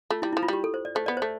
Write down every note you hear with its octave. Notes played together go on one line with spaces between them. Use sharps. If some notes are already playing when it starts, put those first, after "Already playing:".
A3 F4
G3 E4
E4
F3
F4
G3 G4
A4
C5
D5
A3 C5
B3 D5
A3 C5